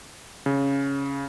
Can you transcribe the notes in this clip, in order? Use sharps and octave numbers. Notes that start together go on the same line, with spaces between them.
C#3